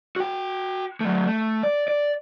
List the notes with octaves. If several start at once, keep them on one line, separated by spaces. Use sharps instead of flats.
F#4 G5
F#3 A3
A3
D5
D5